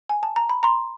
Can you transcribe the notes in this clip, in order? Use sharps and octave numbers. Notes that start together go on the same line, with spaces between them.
G#5
A5
A#5
B5
A#5 C6